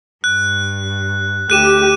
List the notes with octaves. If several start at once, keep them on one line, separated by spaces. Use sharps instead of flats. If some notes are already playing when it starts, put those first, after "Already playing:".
G2 F#6
D2 G4 F#6 D#7 E7